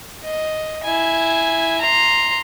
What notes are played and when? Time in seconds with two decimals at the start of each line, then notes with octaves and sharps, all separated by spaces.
0.23 D#5
0.84 E4 G#5
1.81 A#5 C6